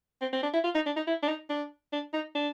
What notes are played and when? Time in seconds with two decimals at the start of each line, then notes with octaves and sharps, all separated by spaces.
0.21 C4
0.33 C4
0.43 D4
0.54 E4
0.64 F4
0.75 D#4
0.86 D4
0.96 D#4
1.07 E4
1.23 D4
1.28 D#4
1.50 D4
1.93 D4
2.13 D#4
2.35 D4